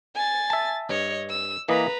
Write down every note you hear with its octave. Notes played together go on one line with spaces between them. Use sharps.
G#5 A6
E5 A5
G2 C#5 D#5
E6
E3 A#3 B4 D#5 A#5